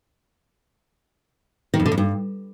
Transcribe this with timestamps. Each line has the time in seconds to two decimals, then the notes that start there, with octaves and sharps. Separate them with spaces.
1.74 D#3
1.80 F2
1.86 D3
1.92 F2
1.98 G2